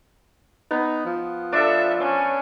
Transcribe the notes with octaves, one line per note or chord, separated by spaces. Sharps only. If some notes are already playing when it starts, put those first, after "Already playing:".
B3 D#4
F3
D4 A4 E5
C#4